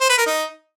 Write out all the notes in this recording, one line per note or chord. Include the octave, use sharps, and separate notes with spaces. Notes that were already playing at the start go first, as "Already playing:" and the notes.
C5
B4
A#4
D#4